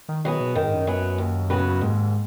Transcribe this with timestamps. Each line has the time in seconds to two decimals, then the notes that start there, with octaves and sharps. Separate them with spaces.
0.09 D#3
0.24 D#3 F#3 B3 G#4
0.40 B2
0.55 F#2 D#3
0.64 G#2
0.73 F#2
0.87 F#3 B3 G#4
1.18 D#2
1.50 C#3 B3 F#4 B4
1.68 F#2
1.81 D#2 G#2